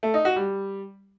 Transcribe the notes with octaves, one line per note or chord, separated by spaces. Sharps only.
A3
D#4
F#4
G3